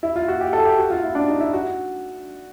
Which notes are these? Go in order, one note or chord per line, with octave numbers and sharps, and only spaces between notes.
E4
F4
F#4
G4
A4
G4
F#4
F4
E4
D4
D#4
E4
F#4